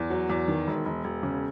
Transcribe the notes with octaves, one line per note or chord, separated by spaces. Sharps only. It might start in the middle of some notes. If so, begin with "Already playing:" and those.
Already playing: E2
F#3
E2
D#3
E1
E1
E1
C#3